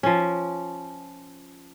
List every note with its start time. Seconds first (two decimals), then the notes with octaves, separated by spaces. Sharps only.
0.03 F3 C#4